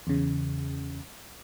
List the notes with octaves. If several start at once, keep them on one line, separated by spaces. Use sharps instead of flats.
E2 C#3